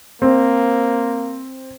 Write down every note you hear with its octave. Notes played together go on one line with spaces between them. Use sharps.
A#3 C4